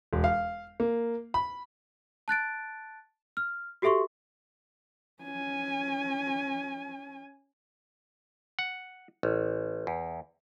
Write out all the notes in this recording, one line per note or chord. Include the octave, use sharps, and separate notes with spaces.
E1
F5
A#3
B5
A5 F#6 A6 D7
F6
F#4 G4 A4 E5 C6 C#6
C#4 G#5
F#5
A1
E2